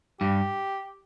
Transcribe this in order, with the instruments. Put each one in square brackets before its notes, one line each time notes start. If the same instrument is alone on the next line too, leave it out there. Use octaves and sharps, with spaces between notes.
[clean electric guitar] G2 [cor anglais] G4